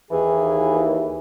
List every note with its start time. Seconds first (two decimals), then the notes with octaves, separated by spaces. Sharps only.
0.11 D#2 E3 G#4